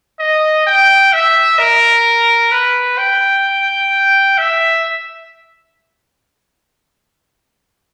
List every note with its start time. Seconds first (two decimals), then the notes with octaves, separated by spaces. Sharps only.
0.19 D#5
0.66 G5
1.13 E5
1.59 A#4
2.52 B4
2.98 G5
4.38 E5